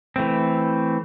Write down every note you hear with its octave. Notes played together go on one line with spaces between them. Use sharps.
E3 A3 C4